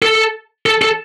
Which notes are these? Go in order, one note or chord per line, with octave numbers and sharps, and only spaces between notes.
A4
A4
A4